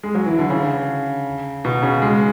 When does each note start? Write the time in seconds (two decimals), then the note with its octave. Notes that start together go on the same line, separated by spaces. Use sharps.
0.03 G#3
0.15 F#3
0.26 E3
0.39 D3
0.50 C#3
1.65 B2
1.82 C#3
2.02 G#3